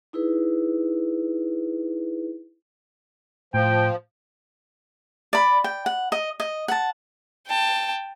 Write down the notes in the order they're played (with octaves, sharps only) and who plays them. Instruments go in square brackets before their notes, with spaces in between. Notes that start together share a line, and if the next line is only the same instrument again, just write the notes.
[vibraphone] D#4 E4 G#4 B4
[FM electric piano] A2 [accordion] F3 [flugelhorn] G5
[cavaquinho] D5 B5
G5
F#5
D#5
D#5
F#5 A5
[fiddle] G5 A5